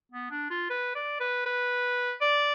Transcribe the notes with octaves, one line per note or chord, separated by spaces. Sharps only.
B3
D4
F4
B4
D5
B4
B4
D5